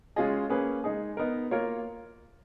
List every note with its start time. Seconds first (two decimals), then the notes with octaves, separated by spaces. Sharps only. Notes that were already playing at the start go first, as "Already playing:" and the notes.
0.16 G#3 C#4 F4 G#4 D#5
0.50 A#3 C#4 G#4 B4
0.84 G#3 D#4 G#4
1.17 B3 D#4 A#4
1.51 A#3 F4 A#4 C#5